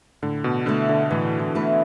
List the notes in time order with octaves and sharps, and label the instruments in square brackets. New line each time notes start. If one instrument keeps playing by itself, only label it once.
[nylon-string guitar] A2 [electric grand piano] D3
[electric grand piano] B2
[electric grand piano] D3 [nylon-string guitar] A3 E4 B4
[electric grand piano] D3
[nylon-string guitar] A2 [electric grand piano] E3
[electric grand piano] E3
[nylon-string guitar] A3 E4 B4